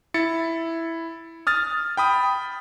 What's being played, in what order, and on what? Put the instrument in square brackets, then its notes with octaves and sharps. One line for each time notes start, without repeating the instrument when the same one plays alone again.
[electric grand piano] E4 A6 C#7
D#6 F6 A6
G5 B5 D#6